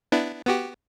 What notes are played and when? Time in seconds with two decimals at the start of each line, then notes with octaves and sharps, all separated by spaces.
0.12 B3 D4 E4
0.47 B3 F#4 G4